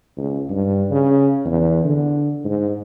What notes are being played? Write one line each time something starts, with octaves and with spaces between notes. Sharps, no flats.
C#2
G2
C#3
E2
D3
G#2